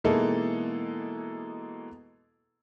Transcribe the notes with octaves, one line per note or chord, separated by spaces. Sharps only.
B2 E3 G#3 A#3 D#4 A4